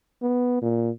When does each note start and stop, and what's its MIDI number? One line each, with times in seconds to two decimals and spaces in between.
0.22 0.60 59
0.62 0.90 46